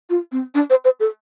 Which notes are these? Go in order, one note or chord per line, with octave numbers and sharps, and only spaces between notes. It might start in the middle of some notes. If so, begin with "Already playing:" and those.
F4
C4
D4
C5
C5
A4